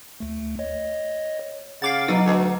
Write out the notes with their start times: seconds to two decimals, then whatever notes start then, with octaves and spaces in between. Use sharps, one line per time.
0.20 D2 A3
0.59 C#5 D#5
1.82 C#3 F5 F#5 D6 A6
2.08 B2 F#3 D#4 B4
2.25 D2